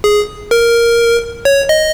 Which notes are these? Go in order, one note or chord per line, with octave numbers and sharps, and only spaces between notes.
G#4
A#4
C#5
D#5